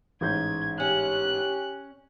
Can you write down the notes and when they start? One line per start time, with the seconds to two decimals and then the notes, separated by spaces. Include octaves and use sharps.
0.21 A1 G#2 G6 G#6
0.80 C#4 G4 F#6